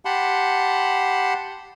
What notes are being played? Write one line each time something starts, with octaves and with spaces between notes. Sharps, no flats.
G4 F#5 A5 B5 C6